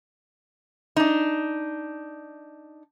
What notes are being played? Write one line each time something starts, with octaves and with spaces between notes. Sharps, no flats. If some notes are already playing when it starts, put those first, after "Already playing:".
D4 D#4